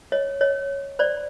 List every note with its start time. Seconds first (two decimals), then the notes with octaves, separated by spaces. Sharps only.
0.12 C#5 D#5
0.41 C#5 D#5
0.99 C5 D5